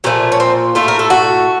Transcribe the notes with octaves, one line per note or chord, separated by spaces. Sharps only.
A#2 F3 A3 C#4
C#4
C4
A2 A3 F4
A#4
A4
F#4